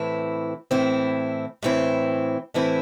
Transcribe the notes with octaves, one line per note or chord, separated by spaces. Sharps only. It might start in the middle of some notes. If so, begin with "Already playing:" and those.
Already playing: A2 E3 C4 E4
A2 E3 C4 E4
A2 E3 C4 E4
A2 E3 C4 E4